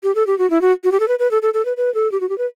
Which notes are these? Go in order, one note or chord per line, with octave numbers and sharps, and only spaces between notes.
G4
A4
G4
F#4
E4
F#4
F#4
G4
A4
B4
B4
A4
A4
A4
B4
B4
A4
G4
F#4
G4
B4